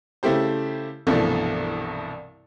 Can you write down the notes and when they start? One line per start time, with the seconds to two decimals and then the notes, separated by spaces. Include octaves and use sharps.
0.23 C#3 A3 E4 G4 C5
1.07 C2 G2 B2 E3 F3 A3